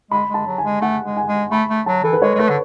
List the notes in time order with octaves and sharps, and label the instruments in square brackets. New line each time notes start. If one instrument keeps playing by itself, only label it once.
[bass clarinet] G#3 [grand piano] B5
[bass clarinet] G#3 [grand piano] A5
[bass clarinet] F#3
[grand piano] G#5
[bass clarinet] G#3
[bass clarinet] A3 [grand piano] F#5
[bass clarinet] G#3
[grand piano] G#5
[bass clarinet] G#3
[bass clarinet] A3 [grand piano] B5
[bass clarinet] A3
[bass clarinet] F#3 [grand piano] A5
[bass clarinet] E3 [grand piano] A4
[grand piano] B4
[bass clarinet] G#3 [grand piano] C#5
[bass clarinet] G#3
[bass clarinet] A3 [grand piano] B4
[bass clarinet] D3